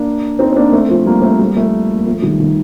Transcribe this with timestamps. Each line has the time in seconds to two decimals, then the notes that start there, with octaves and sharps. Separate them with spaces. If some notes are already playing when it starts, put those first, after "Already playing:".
Already playing: A#3 D4
0.39 C4 D#4
0.52 C4
0.56 A#3 D4
0.72 A3 C4
0.89 F3 A3
1.06 G3 A#3
1.22 A3 C4
1.39 G3 A#3
1.57 F3 A3
1.94 A#3
2.06 F3 A3
2.22 D#3 G3
2.40 D#3 G3